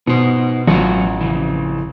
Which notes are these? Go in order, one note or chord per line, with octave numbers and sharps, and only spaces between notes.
B2 D#4 C5
A1 F#3 F4 F#4
F2 C#3 E3